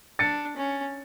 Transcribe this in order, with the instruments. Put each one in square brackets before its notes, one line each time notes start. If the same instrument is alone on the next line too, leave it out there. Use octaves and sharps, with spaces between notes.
[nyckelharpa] D4 [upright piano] A6 C#7
[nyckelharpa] C#4